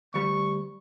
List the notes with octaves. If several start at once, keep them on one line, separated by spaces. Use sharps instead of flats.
D2 G3 C#6